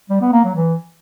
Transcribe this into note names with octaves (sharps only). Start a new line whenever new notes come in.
G3
B3
A#3
F#3
E3